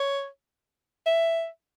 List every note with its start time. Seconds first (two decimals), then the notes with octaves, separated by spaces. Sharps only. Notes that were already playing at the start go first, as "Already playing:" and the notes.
Already playing: C#5
1.06 E5